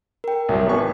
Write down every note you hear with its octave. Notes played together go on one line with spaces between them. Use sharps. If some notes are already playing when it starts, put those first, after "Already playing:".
A#4 G5
C2 F#3
G#1 B3 C#6